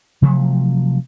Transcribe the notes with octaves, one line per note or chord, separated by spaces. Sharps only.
C3 F3 F#3 A3